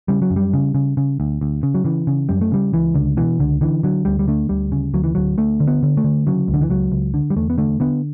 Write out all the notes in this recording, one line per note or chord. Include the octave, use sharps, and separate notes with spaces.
C#3 G3
F#3
F#2
G3
C#3
C#3
C#3
D2
D2
C#3
F#3
C#3 E3
C#3
F#2 G3
A3
C#3 G3
C#2 E3
C#2 D3
B2 E3
C#2 D3
D3 E3
D3 F#3
D2 G3
G3
D3 A3
D2 G3
C#3
D2 F#3
E3
D2 F#3
D2 A3
D3
B3
D3
A3
D3
C#3 F#3
C#2
D3
E3
C#2 F#3
C#2
D3
G3
E2 A3
B3
D3 A3
D3 B3